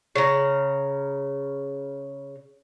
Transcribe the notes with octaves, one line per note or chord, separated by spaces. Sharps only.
C#3 A#5